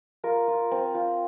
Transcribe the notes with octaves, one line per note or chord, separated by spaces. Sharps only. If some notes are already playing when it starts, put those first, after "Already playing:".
F4 A#4
F4
C4
F4